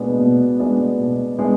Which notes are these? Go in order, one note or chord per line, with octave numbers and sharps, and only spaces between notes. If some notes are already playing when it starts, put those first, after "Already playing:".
Already playing: B2 G#3 B3 D4
B2
G#3 B3 D4
B2
G#3 B3 D4